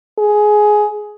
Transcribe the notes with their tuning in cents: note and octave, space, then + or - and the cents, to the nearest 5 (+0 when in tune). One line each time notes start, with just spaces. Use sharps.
G#4 +10